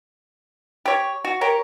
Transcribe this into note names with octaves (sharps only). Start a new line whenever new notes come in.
G4 C#5
F#4
G4 A#4 C#5